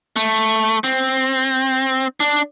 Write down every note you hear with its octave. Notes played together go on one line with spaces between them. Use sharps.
A3
C4
D4